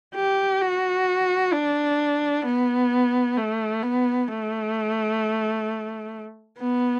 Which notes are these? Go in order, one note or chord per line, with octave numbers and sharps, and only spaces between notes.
G4
F#4
D4
B3
A3
B3
A3
B3